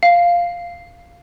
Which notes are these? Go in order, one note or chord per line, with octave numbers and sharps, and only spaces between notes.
F5